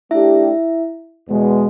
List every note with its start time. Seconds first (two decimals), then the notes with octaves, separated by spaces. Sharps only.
0.11 A3 D4 E4 G4 E5
1.28 E2 B2 G#3